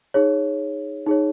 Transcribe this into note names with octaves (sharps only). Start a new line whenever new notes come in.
D#4 G#4 C#5
D#4 G#4 C#5